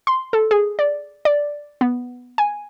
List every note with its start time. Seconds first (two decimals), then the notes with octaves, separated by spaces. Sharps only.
0.07 C6
0.33 A4
0.51 G#4
0.79 D5
1.25 D5
1.81 B3
2.38 G#5